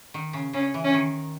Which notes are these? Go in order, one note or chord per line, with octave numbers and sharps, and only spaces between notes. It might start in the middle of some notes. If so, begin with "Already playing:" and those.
D#3
C#3
C#3 C#4
E3
C#4
D#3